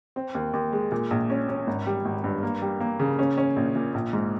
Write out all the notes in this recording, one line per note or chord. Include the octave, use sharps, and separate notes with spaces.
C4
D#2
D#2
G#3
A#2
A#1
C#4
C#4
G#1
G3
G#1
G2
A#3
G3
A#3
C#3
C#4
C#4
A#1
A#2
A#1
G#2